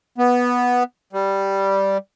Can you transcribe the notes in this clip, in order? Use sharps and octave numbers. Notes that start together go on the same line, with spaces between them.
B3
G3